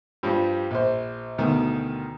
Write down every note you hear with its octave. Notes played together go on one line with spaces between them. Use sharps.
G2 F3 G3
A#1 C5
D2 B2 D#3